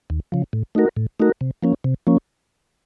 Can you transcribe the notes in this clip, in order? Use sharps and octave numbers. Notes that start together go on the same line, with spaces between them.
D#2
C#3 F3
A2
A3 D#4 F#4 A#4
A2
A3 D#4 F#4 A#4
C3
F3 A#3 C#4
C3
F3 A#3 C#4